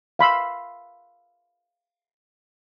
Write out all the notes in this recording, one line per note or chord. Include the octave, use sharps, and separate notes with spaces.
F5 B5 C6 E6